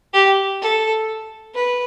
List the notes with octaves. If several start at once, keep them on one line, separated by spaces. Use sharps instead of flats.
G4
A4
B4